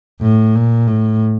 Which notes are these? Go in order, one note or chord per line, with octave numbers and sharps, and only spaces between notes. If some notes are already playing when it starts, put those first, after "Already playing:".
A2
A#2
A2